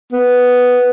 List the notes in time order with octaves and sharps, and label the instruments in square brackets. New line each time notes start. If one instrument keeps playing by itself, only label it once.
[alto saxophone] B3